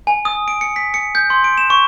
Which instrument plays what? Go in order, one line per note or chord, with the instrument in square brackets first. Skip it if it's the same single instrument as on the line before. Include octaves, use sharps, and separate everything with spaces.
[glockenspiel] G#5
D#6
D7
C#7
B6
C#7
G6
C6
D7
E7
C#6